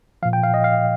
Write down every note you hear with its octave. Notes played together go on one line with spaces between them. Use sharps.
A#2 F3 F5
G5
F5
D#5
F5